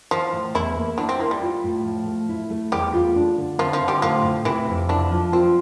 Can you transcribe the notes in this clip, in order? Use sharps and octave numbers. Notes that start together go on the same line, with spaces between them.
E3 F3 F4
A2
E2 E3 E4
A#3
D3 D4 E4
C4
A#3 E4
G3
F4
A2
F3
A3
E4
A3
E2 G3 G4
F4
D4
D3
F3 C4 F4
F3 F4
D3
G3 G4
A2 F3 F4
A2
C3 E3 E4
F2
D3 D4 E4
F3
C4 F4